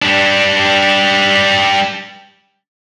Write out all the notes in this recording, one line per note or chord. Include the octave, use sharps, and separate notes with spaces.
G3 D4